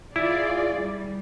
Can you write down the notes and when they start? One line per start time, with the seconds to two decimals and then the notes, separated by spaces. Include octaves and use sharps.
0.16 E4 F4 G#4 D5
0.76 G3